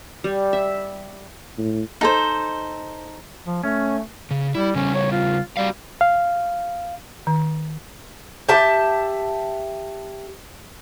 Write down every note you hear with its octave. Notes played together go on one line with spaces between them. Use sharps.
G3
E5
A2
D#4 A4 C5
F3
A3 C#4
C#3
G3 E4
C#3 G3 C#4
C#5
F4
G3 F#4 D5 F5
F5
D#3
G4 E5 A5